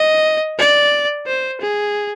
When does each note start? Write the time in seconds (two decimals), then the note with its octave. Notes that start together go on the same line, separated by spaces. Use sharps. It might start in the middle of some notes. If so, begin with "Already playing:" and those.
Already playing: D#5
0.59 D5
1.27 C5
1.61 G#4